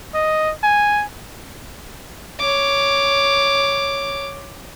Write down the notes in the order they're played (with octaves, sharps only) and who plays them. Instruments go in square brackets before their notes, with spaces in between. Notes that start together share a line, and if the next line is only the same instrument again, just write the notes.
[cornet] D#5
G#5
[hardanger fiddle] C#5 D6